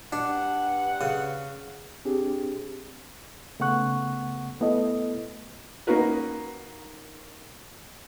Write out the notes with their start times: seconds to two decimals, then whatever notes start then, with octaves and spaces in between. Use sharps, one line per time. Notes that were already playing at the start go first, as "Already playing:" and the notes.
0.13 G2 D4 F#5
1.01 C#3
2.05 C4 D4 G4 G#4
3.60 C#3 A3 B3 F#5 C#6 F#6
4.60 A3 B3 E4 A4 D#5
5.87 A#3 C#4 D#4 F#4 A#4 B4